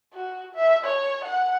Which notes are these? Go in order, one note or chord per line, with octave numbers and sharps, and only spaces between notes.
F#4
E5
C#5
F#5